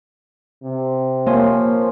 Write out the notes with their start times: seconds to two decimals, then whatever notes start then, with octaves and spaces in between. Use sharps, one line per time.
0.64 C3
1.27 F3 A#3 C#5 G#5 C6